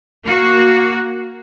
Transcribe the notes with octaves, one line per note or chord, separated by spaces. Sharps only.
A#3 F#4